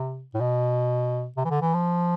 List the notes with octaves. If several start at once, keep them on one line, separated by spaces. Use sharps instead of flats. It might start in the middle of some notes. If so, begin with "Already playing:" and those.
Already playing: C3
A2
B2
C3
E3
D3
E3
F3